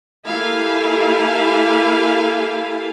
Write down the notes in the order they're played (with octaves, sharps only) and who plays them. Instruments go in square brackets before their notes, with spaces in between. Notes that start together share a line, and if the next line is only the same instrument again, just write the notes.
[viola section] A#3 E4 G4 A4 F5 G#5